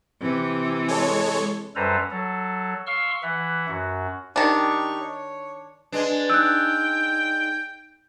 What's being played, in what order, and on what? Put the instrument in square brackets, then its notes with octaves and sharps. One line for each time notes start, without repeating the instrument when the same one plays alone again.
[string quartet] C3 E3
[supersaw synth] G#3 A4 C#5
[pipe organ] F#2 G3 A4 B4 C5 A#5
F#3 A4
F5 C6 C#6 E6 F6
E3 E5 F#5
F#2 F#4
[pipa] D#3 D4 [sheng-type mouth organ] D#4 G4 C#6
[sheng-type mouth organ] C#5
[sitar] G#3 D4 [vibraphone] B4
[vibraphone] D#4 [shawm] G5 [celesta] E6 F#6